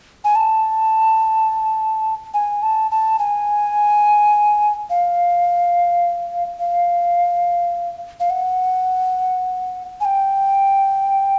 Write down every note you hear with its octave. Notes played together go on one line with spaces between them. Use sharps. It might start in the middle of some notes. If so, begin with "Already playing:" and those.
G#5
A5
G#5
A5
A5
G#5
F5
F5
F5
F#5
G#5
G5